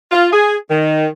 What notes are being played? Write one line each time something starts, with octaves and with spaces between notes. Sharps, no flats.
F4
G#4
D#3